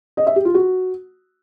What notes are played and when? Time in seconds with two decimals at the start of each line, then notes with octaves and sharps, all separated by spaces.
0.17 D#5
0.27 E5
0.36 G4
0.45 F4
0.54 F#4